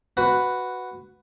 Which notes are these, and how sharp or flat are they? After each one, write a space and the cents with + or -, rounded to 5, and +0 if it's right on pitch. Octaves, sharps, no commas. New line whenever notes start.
F#4 +0 B4 +5